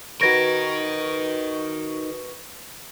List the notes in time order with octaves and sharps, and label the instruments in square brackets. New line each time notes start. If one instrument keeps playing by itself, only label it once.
[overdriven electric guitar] D#4 A#4 [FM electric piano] F#4 B4 C#6 [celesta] G#6 A#6 D7